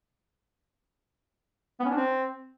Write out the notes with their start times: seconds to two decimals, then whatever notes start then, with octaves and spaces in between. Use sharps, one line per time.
1.80 B3
1.85 C#4
1.91 D4
1.96 C4